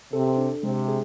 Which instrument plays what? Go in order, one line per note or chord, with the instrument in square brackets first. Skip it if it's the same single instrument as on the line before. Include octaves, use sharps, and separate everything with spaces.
[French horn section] C3 [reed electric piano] A4
[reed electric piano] D4
[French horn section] C3 [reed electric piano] G#3
[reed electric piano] G#4